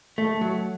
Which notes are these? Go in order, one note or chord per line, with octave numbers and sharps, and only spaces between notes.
A3
F#3